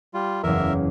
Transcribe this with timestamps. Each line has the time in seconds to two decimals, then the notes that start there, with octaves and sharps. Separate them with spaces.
0.14 G3 F4
0.43 F#1 E2 A#4 E5